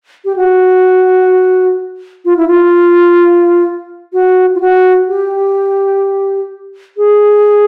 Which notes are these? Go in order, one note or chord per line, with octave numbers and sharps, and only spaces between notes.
G4
F#4
F4
E4
F4
F#4
F4
F#4
G4
G#4